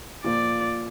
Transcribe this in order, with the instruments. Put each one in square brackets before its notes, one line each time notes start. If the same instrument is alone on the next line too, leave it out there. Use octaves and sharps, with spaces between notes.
[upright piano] A#2 F3 A#3 [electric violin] D5